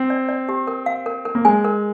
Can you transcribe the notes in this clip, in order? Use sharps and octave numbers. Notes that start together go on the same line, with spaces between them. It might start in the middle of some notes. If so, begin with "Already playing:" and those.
Already playing: C4
D5
D5
G4
A#4
F5
A#4
A#4
A#3
G#3 G#5
A#4